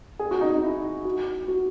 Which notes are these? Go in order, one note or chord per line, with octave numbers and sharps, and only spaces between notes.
G#4
F#4
D#4
D#4
E4
F#4
F#4